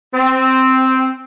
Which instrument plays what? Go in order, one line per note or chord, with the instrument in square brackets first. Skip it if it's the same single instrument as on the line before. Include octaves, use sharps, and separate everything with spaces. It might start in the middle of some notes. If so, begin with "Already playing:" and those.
[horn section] C4